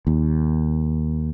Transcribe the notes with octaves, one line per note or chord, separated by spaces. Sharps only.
D#2